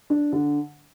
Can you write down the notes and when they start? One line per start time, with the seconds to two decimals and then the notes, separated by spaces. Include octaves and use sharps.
0.10 D4
0.32 D3